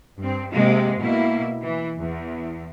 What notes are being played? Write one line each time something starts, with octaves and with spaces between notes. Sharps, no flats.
G2 C4
C3 G#3 A#3
B2 A#3 E4
E3
E2